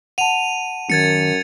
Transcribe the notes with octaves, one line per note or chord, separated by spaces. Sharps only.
F#5 A5 D#7 F7
F#2 D#3 G#6 A6 C#7